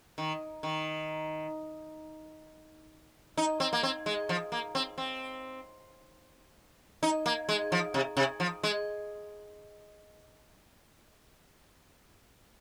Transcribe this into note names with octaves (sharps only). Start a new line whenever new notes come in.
D#3
D#3
D#4
C4
A#3
C4
G#3
F3
A#3
C4
C4
D#4
A#3
G#3
F3
C3
C3
F3
G#3